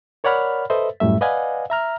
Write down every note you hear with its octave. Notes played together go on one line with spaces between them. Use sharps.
A#4 C#5 D5 F#5 B5 F6
A4 B4 C5 D#5 E5
F#2 A2 G3 A3 E5
B4 D5 D#5 F5 F#5 G#5
E5 A#5 F6